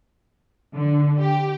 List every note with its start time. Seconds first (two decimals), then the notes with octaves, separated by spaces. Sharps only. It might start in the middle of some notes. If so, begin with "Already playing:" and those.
0.75 D3
1.19 G4